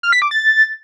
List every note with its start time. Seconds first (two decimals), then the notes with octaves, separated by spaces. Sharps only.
0.03 F6
0.12 B6
0.22 D6
0.31 A6